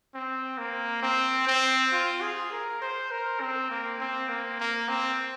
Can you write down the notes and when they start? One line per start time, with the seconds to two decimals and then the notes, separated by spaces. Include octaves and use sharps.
0.14 C4
0.58 A#3
1.02 C4
1.47 C4
1.92 F4
2.21 G#4
2.52 A#4
2.82 C5
3.11 A#4
3.41 C4
3.70 A#3
4.00 C4
4.29 A#3
4.60 A#3
4.88 C4